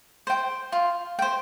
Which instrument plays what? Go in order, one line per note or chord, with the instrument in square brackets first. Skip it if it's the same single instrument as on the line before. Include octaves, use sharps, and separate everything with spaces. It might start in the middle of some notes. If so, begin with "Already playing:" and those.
[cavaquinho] C5 G5
F4
C5 G5